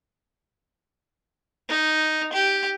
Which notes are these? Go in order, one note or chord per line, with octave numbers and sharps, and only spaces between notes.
D#4
G4